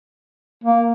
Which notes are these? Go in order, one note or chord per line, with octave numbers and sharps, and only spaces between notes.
A#3